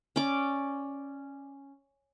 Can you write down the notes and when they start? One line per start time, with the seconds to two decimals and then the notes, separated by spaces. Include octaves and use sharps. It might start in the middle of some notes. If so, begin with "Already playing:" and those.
0.16 C#4 D5 D6